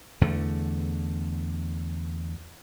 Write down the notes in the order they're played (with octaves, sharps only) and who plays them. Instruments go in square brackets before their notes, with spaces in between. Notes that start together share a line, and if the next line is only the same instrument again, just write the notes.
[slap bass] E2 D3 A3